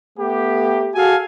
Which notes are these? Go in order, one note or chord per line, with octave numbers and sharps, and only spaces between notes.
A3 B3 G4
F#4 G#4 A4 F5 G#5